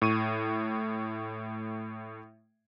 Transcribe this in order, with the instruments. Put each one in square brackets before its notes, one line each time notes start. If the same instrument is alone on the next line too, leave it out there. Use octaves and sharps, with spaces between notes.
[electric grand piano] A2 C#6 D#7